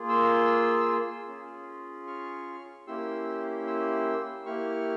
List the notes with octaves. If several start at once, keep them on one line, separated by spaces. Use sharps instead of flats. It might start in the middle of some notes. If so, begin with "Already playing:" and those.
Already playing: A#3 F4 G#4
C6 E6
C#4 F4 G#4
C#6 F6
A#3 C#4 E4 G4 C6 E6
C6 E6
A#3 E4 G4 C#6 F6